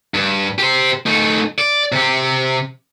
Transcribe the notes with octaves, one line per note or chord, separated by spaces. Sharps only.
G2
G4 C5
A3 D#4
D5
C3 G4